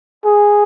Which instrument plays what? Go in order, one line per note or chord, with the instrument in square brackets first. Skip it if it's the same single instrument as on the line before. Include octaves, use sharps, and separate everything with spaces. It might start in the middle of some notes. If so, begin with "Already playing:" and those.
[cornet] G#4